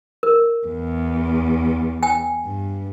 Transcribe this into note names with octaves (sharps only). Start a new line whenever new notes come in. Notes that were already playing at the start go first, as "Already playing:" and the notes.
A#4
E2
G5 G#5
G2